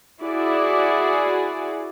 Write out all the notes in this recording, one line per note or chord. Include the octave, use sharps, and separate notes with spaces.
E4 F#4 G#4 D5